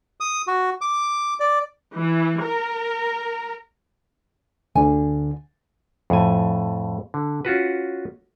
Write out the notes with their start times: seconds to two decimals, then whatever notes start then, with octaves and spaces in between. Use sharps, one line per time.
0.20 D#6
0.47 F#4
0.81 D6
1.40 D5
1.96 E3
2.42 A#4
4.75 D2 D3 G#5
6.10 F2 A2 G#5
7.14 D3
7.45 C#4 F4 F#4 B4